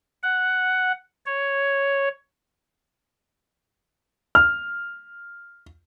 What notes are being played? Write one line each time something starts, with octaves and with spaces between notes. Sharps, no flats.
F#5
C#5
F6